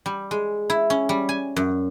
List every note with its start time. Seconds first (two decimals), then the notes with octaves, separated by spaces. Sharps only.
0.06 G3
0.31 G#3
0.70 E4
0.90 C#4
1.09 G3
1.29 G#5
1.56 F#2